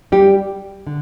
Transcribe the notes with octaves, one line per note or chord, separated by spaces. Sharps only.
G3 G4
D3